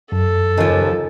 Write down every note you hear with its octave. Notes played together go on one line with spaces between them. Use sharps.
F#2 A4
D#2 C#3 F3